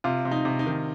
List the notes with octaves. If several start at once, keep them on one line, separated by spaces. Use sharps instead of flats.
C3 F4
C3
D#4
C3
D#4
D#3